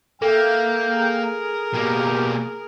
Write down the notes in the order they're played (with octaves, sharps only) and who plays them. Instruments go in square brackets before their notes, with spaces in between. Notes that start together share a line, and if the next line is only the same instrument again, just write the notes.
[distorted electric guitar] A#3 [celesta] A4 [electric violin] E5 F5 [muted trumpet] G5
[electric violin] G#4 A#4
[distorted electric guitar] B2 A#3 [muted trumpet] G4